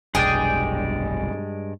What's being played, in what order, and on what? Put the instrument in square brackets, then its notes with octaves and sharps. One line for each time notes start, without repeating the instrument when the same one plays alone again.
[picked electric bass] F1 B1 [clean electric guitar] G2 G#3 D5 [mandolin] G#4 G5